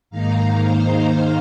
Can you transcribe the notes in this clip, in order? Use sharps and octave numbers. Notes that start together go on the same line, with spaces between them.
G#2 D#3 A#3 D#4 F5 A#5
C5 F5